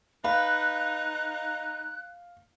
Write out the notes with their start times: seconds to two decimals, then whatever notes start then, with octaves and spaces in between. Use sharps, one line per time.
0.24 D#4 B4 F5 F#6